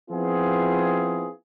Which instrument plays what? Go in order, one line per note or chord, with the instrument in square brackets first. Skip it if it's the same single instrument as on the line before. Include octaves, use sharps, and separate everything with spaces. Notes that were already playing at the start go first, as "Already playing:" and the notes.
[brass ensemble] F3 B3 C4 E4 F4 G#4